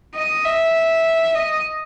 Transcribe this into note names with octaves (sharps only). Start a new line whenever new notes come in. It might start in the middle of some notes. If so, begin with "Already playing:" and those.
D#5
E5
D#5